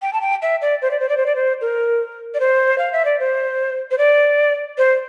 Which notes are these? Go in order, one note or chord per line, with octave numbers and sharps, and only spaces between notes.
G5
A5
G5
E5
D5
C5
D5
C5
D5
C5
D5
C5
A#4
D5
C5
F5
E5
D5
C5
C5
D5
C5